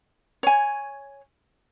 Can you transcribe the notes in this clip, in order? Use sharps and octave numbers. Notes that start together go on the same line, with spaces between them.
C#5 G#5